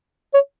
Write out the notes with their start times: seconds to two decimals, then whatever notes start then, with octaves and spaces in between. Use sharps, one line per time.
0.34 C#5